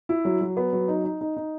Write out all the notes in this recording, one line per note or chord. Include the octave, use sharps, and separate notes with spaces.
E4
F#3
F#3
B3
F#3
D#4
D#4
D#4
D#4